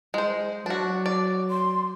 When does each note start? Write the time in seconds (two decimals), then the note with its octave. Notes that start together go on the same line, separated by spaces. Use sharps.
0.14 G#3 C5
0.66 F#3 D4 F#4
1.06 D5
1.50 C6